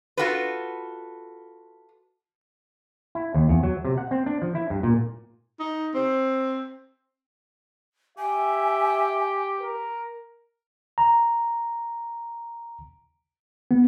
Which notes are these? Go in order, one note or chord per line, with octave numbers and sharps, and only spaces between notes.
F4 F#4 A4 B4
E4
D#2
E2
F#3
C3
F#5
C4
D4
F3
E4
G2
A#2
D#4
C4
G4 E5 G#5
A#4
A#5
B3